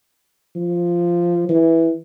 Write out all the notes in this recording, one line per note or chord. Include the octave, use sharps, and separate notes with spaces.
F3
E3